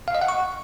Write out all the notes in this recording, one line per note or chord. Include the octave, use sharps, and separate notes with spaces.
F5
D#5
F#5
C#6